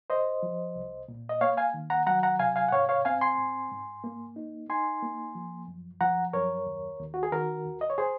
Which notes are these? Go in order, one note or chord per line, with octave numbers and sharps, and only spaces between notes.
C2 C5 D#5
F3
C2
A#2
D#5
A#3 C#5 F5
F5 G#5
D#3
F#5 A#5
F#3 F#5 A#5
F#5 A#5
C3 F5 G#5
F5 G#5
F#5
G#2 C#5 F5
C#5 F5
C4 F5 G#5
G#5 C6
G#2
G#2
A#3
D#4
D#4 G#5 C6
A#3
F3
F#2
F3 F#5 A#5
F#2 A#4 C#5
D#2
D#2
F#4
G#4
D#3 F#4 A#4
D#2
D#5
C#5
G#4 C5